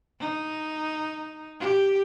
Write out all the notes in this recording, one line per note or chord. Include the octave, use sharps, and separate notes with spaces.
D#4
G4